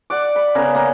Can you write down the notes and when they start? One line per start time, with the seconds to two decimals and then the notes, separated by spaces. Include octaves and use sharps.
0.10 D5 F#5 D6
0.36 B5
0.55 C#3 B3 A#4
0.74 A#3